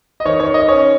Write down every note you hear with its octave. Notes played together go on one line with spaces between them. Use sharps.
D#5
D#3 C#5
C#5
D#3
D#5
C#4 C#5